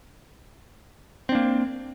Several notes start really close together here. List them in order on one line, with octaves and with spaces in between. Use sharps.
C4 D4 A#3